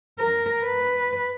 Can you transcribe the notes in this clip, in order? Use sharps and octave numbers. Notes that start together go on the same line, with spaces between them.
A#4
B4